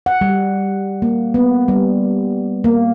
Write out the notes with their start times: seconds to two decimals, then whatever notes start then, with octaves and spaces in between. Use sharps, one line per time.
0.06 F#5
0.21 G3
1.02 A#3
1.34 B3
1.68 G3
2.64 A#3